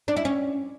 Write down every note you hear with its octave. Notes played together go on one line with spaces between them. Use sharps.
D4
E4
C#4